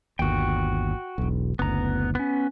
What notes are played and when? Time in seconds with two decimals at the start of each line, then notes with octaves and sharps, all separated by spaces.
0.19 G1 D#2 F#4 G5
1.18 E1 B1
1.59 F#1 D2 B3 A#5
2.15 B3 C#4